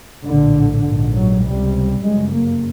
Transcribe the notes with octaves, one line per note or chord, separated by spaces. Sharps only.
A#1 A2 D3
A#1 G#2
F#3
C#2 C3 G3
G1 F#2 C#3 G#3
A#3